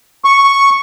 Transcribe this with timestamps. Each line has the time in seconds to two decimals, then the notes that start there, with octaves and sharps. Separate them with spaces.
0.25 C#6